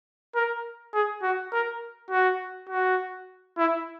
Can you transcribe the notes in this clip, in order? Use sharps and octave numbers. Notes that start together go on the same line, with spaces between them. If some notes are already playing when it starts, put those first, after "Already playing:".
A#4
G#4
F#4
A#4
F#4
F#4
E4